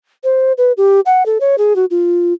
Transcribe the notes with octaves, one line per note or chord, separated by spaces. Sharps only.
C5
B4
G4
F#5
A4
C#5
G#4
F#4
F4